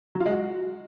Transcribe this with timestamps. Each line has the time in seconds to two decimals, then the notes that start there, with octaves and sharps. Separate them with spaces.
0.15 F#3
0.20 F4
0.26 G#3
0.31 F#4